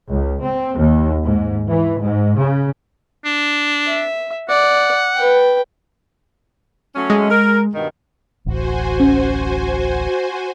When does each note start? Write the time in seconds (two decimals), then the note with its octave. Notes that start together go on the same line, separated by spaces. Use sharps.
0.10 C#2
0.42 C4
0.77 D#2
1.23 G#2
1.68 E3
2.00 G#2
2.37 C#3
3.25 D4
3.87 E5
4.49 D5 F#5
5.16 B4 G5
6.95 F#3 A3 C#4
7.10 G#3
7.30 A#4
7.74 G2 B2 D#3
8.46 D1 A1 F#4 C5 G#5
9.00 C#4